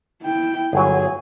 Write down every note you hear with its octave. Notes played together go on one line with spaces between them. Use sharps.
E4 G5
G1 F#3 G#4 G#5